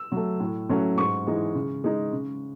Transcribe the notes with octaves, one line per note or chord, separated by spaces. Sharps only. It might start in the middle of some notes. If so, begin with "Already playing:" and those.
Already playing: E6
F#3 A3
A2
F#3 A3 C#4
G#2 C#6
E3 G#3 D#4
C#3
G#3 D#4
C#3